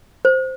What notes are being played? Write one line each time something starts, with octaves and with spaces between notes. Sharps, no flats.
C5